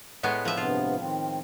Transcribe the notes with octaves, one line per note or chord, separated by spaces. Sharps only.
A2 G#3 B3
F3 E5
G2 C3 B3 F4
D#3 C4